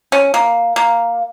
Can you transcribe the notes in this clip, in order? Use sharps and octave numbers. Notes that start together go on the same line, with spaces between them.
C#4
A#3
A#3